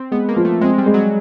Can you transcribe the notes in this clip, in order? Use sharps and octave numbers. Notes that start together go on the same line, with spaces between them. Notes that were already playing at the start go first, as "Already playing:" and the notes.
Already playing: C4
G#3 B3
A#3
F3
A3
G#3 C4
G3
G#3
F#3